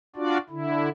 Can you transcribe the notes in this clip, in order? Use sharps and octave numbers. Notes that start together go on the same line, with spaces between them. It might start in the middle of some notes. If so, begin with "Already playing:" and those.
D4 F4 F#4 D5
D3 E4